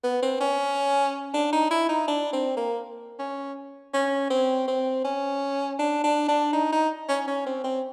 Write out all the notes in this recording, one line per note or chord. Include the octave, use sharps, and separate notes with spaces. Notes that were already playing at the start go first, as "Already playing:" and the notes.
B3
C4
C#4
D4
D#4
E4
D#4
D4
C4
A#3
C#4
C#4
C4
C4
C#4
D4
D4
D4
D#4
D#4
C#4
C#4
C4
C4